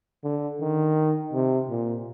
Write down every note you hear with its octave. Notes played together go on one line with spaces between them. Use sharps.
D3
D#3
C3
A#2